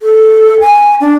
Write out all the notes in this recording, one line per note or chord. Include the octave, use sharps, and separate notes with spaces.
A4
G#5
D4